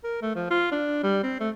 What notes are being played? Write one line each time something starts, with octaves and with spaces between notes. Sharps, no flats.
A#4
A3
F3
F4
D4
G3
C4
A3